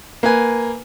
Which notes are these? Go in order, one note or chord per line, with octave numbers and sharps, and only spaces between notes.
A#3 B4 G#5